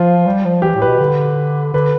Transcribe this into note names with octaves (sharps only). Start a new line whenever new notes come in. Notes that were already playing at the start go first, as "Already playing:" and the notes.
Already playing: F3 F4
G3
F3
E3 G4
A2
B4
B2
D3
D3 B4